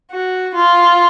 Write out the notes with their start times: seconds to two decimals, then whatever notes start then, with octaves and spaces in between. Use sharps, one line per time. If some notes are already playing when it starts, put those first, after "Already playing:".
0.12 F#4
0.54 F4